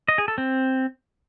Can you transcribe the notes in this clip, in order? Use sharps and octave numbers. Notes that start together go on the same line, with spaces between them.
D#5
G#4
A4
C4